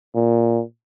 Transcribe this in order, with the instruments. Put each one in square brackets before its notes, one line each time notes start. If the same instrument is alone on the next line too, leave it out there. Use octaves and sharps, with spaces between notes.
[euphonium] A#2